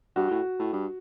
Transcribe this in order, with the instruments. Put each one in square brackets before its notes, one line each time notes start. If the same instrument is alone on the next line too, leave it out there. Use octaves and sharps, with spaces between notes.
[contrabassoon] G2 [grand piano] F#4
[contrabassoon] A2
A2
G2